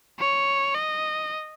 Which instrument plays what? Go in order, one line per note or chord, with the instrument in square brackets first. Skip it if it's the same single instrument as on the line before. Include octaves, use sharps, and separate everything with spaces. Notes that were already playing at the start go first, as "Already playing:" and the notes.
[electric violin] C#5
D#5